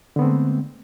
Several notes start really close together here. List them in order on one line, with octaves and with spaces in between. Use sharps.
D3 B3 C4 A3 G#3